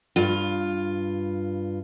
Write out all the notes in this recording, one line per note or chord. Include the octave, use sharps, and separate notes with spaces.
G2 F4